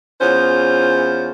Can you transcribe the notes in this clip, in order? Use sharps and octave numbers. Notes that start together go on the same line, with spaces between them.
E2 C#4 F4 C5